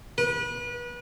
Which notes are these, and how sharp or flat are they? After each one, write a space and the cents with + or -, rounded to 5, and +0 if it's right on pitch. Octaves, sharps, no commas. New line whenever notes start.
B4 -30